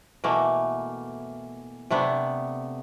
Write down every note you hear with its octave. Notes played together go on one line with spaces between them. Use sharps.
B2 E3 A3 A#3
C3 A3 B3 D4